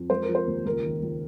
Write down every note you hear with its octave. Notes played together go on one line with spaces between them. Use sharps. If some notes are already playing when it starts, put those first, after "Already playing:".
Already playing: F2
G#3 C5
A#4
F3
C5
D#2
C#2 A#4
D#3
C#2